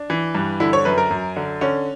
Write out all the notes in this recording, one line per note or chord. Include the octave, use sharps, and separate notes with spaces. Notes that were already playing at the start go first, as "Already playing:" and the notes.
Already playing: D4
E3
G2
D3 E4
C#5
F#2 B4
A#4
F#2
D3
D3 C#4